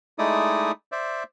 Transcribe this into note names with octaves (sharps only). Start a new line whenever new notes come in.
G#3 A3 D#4 E4 D5 D#6
C5 D5 E5